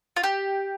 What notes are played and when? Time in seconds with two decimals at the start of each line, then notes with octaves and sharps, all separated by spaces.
0.16 F4
0.23 G4